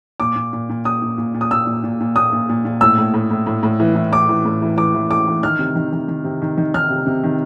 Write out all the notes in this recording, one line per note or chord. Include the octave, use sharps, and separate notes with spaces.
A#2 D6
A#2
A#2
A#2
A#2 D#6
A#2
A#2
A#2
D#6
A#2 E6
A#2
A#2
A#2
A#2 D#6
A#2
A#2
A#2
A2 E6
A2
A2
A2
A2
A2
E3
E3
A2 D6
E3
A2
E3
E3 D6
E3
A2 D6
E3
D#3 F6
C3
D#3
D#3
D#3
C3
D#3
D#3
D#3 F6
C3
C3
D#3